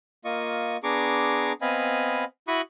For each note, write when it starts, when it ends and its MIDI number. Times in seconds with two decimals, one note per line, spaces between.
0.25 0.77 58
0.25 0.77 65
0.25 0.77 75
0.25 0.77 85
0.83 1.52 59
0.83 1.52 62
0.83 1.52 68
0.83 1.52 82
0.83 1.52 85
0.83 1.52 86
1.61 2.24 59
1.61 2.24 60
1.61 2.24 75
1.61 2.24 77
1.61 2.24 80
1.61 2.24 83
2.48 2.61 64
2.48 2.61 66
2.48 2.61 83
2.48 2.61 85
2.48 2.61 87
2.48 2.61 90